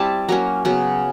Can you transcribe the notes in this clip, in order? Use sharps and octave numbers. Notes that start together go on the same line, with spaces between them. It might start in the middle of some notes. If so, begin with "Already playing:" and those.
Already playing: G3 C4 E4 A5
F#3 A#3 C#4 A#5
C#3 F#3 B3